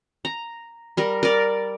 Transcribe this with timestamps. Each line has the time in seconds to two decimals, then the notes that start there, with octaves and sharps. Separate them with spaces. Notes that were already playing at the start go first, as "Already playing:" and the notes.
0.25 A#5
0.97 G3 A#4
1.23 A#4 D5